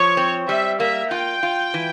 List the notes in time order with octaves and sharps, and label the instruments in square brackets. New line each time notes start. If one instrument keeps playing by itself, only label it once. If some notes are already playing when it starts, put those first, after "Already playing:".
Already playing: [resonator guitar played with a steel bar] F3 [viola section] C#5
[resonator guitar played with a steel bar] C4
[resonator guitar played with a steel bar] G3 [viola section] E5
[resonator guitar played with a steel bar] A#3 [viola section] E5
[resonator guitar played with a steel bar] F4 [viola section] G5
[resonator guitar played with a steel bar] F4
E3